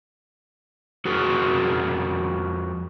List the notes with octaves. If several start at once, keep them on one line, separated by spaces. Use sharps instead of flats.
F2 F#4 G#4 A#4